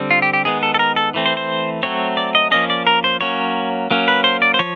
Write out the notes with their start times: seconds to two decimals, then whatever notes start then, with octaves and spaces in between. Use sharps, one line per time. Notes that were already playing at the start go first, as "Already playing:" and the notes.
Already playing: D3 G3 C4
0.11 F4
0.22 G4
0.33 G4
0.45 D#3 G#3 B3 G#4
0.63 A4
0.74 A4
0.79 A#4
0.96 A4
1.14 E3 A3 C4
1.26 C5
1.37 C5
1.83 F#3 A3 C4 C#5
2.17 D5
2.35 D#5
2.51 F3 A#3 C#4 D#5
2.70 D5
2.87 A#4
3.04 C5
3.21 F#3 A#3 C#4 C#5
3.91 F#3 A#3 C#4
4.08 B4
4.24 C5
4.42 D5
4.54 C5
4.59 F3 C#5